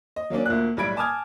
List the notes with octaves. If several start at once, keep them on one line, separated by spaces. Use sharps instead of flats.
D#5
F#3 A#3 C#4 D4
D2 A#2 A#3 F#6
B1 A2 G3 B5 G#6 D7
G#5 A5 D6 D#6 F6 G#6